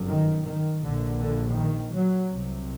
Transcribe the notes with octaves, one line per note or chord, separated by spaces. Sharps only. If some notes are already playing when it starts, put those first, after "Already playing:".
Already playing: G1 F#2
D#3
D#3
A#1 A#2 D3
D3
D#3
F#3
C2 C3